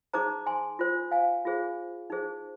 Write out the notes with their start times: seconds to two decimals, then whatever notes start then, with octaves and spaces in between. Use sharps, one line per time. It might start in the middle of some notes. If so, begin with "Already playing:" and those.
0.13 D#4 G#4 C5 A#5 D6
0.46 G#5 C6
0.79 F4 C5
1.11 F5 G#5
1.45 F4 G#4 C5
2.10 D#4 G#4 C5